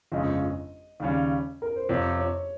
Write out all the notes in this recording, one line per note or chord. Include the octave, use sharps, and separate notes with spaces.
G1 F2 C#3 G#3 C#4 D#5
D#2 C#3 G3 C#4
A#4
C5
F2 C3 F3 C#5
C#5